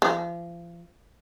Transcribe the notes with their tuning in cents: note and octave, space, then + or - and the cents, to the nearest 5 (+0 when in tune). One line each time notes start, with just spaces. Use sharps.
F3 -35